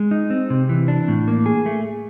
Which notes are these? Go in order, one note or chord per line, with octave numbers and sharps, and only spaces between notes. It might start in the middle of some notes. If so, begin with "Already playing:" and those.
Already playing: G#3
D#4
C4
C3
E3
D4
A2
A#3
G#4
A3